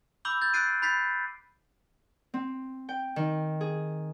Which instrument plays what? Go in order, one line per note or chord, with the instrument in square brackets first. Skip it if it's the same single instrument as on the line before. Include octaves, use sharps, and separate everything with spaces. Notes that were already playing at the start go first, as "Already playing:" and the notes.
[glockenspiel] B5 D6 E6 G6 F#7 G7
G6 A6
E6 F#6 A6 C7 D7 D#7
B5 G6 A6 B6 C7
[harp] C4
G5
D#3
G#4